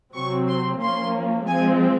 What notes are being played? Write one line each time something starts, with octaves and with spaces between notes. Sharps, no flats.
C3 F#3 C4 C#6
C6
F3 A#3 C#4 C6
F3 G#3 C4 G#5